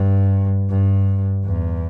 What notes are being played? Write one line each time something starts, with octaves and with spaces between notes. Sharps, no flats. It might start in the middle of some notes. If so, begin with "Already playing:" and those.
Already playing: G2
G2
E2